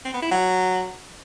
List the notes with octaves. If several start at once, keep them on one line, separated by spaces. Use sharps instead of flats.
C4
B3
E4
F#3